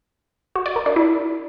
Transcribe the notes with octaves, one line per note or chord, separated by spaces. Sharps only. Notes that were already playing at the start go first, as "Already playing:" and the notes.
F#4
D5
A#4
D4
E4